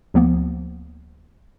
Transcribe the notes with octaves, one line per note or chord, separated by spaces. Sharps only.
D2 F3 A#3 B3